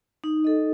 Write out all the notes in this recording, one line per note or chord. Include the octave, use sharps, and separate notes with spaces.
D#4
A4 D#5